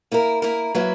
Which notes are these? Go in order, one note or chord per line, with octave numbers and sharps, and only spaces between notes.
A#3 E4 A#4
A#3 E4 A#4
F#3 A#3 E4 B4